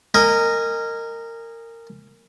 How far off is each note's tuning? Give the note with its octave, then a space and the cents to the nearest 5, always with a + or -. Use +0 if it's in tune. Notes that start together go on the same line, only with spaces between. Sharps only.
A#4 -20 D#5 -5 G#5 -25